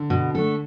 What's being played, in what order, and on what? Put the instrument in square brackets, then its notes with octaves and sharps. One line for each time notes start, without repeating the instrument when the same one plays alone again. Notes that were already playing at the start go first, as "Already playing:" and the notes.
Already playing: [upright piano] D3
[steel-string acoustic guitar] B2
A3 D4 A4